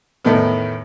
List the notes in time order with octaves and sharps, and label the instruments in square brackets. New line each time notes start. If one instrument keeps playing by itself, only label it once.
[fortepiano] E2 A2 D#3 A3 B3